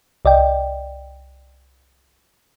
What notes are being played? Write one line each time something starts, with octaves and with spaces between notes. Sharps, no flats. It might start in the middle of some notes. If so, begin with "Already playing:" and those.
C2 D5 D#5 G5